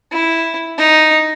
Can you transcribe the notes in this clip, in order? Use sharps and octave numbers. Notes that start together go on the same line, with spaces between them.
E4
D#4